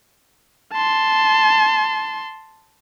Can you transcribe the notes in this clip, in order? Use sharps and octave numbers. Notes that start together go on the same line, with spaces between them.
A5 C6